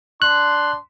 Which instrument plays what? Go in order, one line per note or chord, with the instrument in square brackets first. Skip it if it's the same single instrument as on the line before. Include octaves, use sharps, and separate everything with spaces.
[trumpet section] D4 C6 [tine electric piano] F#6